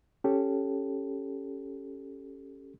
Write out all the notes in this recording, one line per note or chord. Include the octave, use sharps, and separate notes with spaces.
C#4 G4 A4